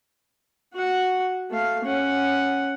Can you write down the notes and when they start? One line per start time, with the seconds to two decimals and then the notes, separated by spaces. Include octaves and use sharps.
0.74 F#4 F#5
1.50 A3 F5
1.84 C#4 F#5